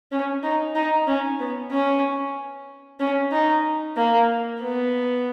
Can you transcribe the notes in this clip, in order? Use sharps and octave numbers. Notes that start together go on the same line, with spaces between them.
C#4
D#4
D#4
C#4
B3
C#4
C#4
D#4
A#3
B3